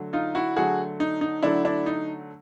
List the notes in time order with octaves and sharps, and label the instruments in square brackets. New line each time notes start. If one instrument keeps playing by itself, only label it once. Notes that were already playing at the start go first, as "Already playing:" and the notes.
Already playing: [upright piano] D3 F#3 A3
D#4 F4
E4 F#4
D3 F#3 A3 F#4 G#4
D#4
D#4
D3 F#3 A3 D4 E4
D4 E4
D#4